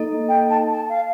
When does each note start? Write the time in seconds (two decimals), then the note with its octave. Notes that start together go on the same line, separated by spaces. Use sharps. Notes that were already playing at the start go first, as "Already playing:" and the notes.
Already playing: A#3 D#4 A4 D#5
0.28 G5
0.50 A5
0.72 A5
0.89 F5